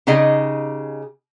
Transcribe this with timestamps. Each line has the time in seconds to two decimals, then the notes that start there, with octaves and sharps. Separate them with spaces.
0.07 C#3 D#4 G4 G#4 D#5